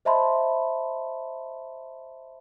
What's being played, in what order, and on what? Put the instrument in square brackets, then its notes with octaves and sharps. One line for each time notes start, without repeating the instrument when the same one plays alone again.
[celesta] C5 D#5 E5 A5 B5 C6